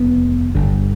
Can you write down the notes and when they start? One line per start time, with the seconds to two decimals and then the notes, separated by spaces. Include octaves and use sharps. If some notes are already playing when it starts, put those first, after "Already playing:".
Already playing: F1 D#2 C#3 B3
0.55 G1 G2 D3